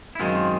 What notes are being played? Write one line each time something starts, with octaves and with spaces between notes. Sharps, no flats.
E4
F#2 D#3 G#3 C4 F4